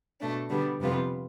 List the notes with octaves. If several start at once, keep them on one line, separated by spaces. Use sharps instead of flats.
B2 A3 D4
D3 G3 B3 D4
F2 C3 G3 B3 F4